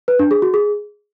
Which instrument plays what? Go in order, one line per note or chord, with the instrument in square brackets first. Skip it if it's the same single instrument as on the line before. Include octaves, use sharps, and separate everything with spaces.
[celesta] B4
D4
G#4
F#4
G#4